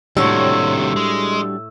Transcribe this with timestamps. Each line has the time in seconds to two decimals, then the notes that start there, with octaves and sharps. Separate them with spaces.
0.17 D#2 A2 C3 G3 D4 F#4 C#5 E6
0.96 G#3